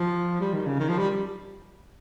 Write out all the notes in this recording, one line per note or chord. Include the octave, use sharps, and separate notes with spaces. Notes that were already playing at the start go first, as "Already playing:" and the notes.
Already playing: F3
G3
D#3
C#3
D#3
F3
G3